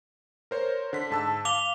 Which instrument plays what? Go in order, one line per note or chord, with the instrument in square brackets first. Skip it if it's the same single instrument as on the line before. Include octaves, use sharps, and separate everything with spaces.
[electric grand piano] A#4 C5 C#5
D3 B6
G#2 A5 E6
[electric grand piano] F5 [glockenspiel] D6 F7 G7